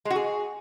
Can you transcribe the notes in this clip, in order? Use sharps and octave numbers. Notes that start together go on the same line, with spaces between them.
G#3
F#4
G#4